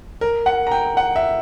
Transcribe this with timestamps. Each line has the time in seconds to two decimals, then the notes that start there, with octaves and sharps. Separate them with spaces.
0.21 A#4
0.46 F#5
0.67 A#5
0.71 G5
0.97 F#5
1.16 E5